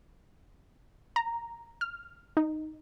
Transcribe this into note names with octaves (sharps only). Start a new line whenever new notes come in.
A#5
F6
D#4